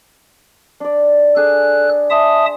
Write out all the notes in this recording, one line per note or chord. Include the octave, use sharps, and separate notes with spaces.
D4 D5
D4 G#4 A4 G#5 F#6
E5 A5 C6 D#6